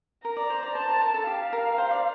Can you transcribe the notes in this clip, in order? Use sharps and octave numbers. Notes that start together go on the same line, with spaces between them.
A#4 A#5
D5
C5
D5
C5 A5
A#4
A#4
A4
G4 F5
A#4
C5
D5